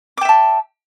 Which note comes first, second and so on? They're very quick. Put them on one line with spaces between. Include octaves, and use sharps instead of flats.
D6 G5 E5 A5